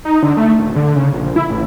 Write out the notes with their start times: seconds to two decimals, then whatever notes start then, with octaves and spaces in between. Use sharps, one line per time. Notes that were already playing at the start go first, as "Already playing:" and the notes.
0.05 D#4
0.23 D3
0.37 A3
0.59 D#1
0.76 D3
0.96 C#3
1.13 A#1
1.36 E4
1.50 A1